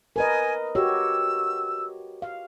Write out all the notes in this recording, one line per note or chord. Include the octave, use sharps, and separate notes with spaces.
A#4 B4 D#5 G#5
F#4 G4 C#5 E6
F5